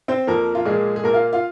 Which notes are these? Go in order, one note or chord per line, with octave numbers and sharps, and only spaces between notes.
C4 C5
F2 F3 A#3 A#4
F4
A#2 F3 G#3 A#3 G#4
G#4
A#2 A#3 A#4
F4 F5
F4 F5